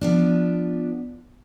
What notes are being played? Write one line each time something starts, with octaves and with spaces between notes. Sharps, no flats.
F3 B3 D4